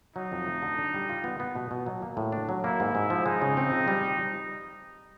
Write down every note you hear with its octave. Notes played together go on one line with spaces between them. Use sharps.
F#3 D#4
F2
A3
D3
D4
G3
F4
B3
B3
B2
B2
F#3
A#3
A2
D4
F#3
A#3 E4
G#2
G#2
F3
G#3 D#4
C#3
C4
F3
G3